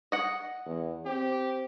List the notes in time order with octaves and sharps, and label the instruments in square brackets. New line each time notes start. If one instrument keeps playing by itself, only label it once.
[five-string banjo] D#5 F#5
[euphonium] E2
[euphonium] C4 [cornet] G4